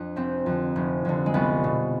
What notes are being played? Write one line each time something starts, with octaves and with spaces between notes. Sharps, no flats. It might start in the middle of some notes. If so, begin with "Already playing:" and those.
Already playing: F2 D4
F1 C4
F2 D3
F1
F2 D3
G#3
C2 B3
B2